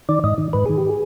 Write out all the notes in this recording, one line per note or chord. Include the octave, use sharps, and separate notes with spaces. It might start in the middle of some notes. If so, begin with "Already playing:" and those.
D#3 D5
G#2 D#5
D#3
G#2 B4
D#3 G#4
G4
G#4